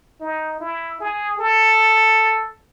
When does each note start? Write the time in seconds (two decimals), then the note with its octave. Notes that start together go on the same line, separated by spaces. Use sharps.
0.21 D#4
0.60 E4
1.00 G#4
1.39 A4